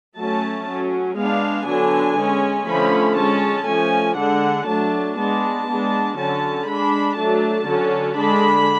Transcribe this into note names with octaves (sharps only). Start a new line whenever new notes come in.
F#3 A3 C#4 A5
F#3 C#4
G#3 B3 D4 F5
D3 F#3 B3 D4 G#5
G#3 C#4
D3 F3 A3 C#4 B5
G#3 C#4 A5
F3 A3 C#4 G#5
D3 G#3 D4 F#5
F#3 A3 D4 A5
G#3 B3 D4 A5
G#3 B3 D4
D3 F#3 C#4 A5
G#3 D4 B5
F#3 A3 D4 A5
D3 F#3 C#4
D3 G#3 D4 B5